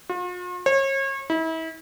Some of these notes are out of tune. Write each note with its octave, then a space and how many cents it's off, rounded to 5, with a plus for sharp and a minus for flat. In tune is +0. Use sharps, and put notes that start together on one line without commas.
F4 +45
C#5 -35
E4 -35